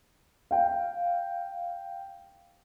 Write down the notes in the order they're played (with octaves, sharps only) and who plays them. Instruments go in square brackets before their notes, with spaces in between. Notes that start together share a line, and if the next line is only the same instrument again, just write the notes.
[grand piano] F5 G5